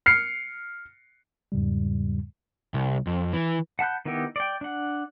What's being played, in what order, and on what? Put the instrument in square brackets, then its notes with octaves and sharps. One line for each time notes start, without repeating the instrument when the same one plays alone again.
[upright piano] F6 C7 C#7
[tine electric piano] E2 G#2 C#3 G3
[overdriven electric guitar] C2
F2
E3
[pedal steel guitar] F#5 A5 B5 F#6 G6
D#3 B3 D#4 E4 G4
D5 G5
D4 F#5